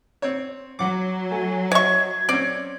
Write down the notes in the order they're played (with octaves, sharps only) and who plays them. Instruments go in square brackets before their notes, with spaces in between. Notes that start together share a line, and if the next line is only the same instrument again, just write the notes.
[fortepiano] C4 C#5
[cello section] F#3 [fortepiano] F#5 D6
[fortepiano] A3 [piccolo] G#5
[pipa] C#5 C#6 [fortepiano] D#5 E5 [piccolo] G#6
[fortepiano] C4 C#4 [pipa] D5